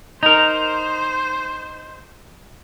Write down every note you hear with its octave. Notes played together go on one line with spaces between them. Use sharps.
D#4 A#4 C5